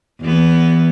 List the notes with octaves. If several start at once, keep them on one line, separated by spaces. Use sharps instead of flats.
E2 B3